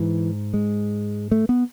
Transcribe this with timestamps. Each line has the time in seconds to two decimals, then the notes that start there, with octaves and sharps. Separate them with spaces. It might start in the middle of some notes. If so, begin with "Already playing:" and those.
Already playing: G#2 E3
0.54 G#3
1.31 A3
1.49 B3